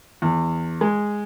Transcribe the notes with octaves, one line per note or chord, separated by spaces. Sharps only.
E2
G#3